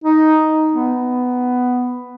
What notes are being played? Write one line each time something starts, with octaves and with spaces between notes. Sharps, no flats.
D#4
B3